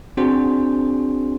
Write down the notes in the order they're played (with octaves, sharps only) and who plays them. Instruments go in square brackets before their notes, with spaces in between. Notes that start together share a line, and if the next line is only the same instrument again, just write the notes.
[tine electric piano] C4 D4 F#4 G#4 C5